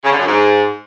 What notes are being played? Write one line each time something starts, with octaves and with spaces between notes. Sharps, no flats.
C#3
D3
F#2
G#2